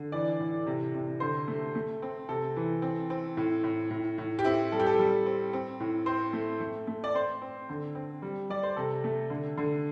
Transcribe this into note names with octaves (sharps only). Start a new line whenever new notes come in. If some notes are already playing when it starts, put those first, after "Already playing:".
Already playing: D3
E3 D5
A2
C3
C3
D3 C5
A3
A3
C4
C3 A4
E3
C4
C4
A2
A2
A2
A2
G4
C4 E4
G3 A4
G4
A4
G3
C4
C4
A2
C4 C5
A3
A3
A3
D5
C4 C5
C4
D3
C4
G3
G3 D5
C5
C3 A4
A3
D3
D3